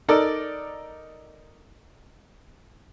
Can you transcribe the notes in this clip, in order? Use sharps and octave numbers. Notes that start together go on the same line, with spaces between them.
D#4 A4 A#4 D5